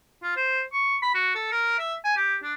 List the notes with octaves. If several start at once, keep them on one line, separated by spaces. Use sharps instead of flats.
F4
C5
C#6
B5
F#4
A4
A#4
E5
G#5
G4
D4